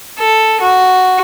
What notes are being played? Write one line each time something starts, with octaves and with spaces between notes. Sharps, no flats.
A4
F#4